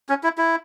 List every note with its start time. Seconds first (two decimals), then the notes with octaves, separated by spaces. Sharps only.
0.09 C#4
0.24 E4
0.38 E4